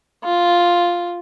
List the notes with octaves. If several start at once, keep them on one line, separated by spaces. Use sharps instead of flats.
F4